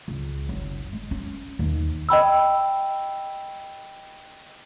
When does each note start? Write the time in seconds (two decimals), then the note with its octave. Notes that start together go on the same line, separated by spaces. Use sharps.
0.08 C#2
0.49 F#1
0.93 G#3
1.11 C#4
1.59 D#2
2.09 D#5 G5 B5 E6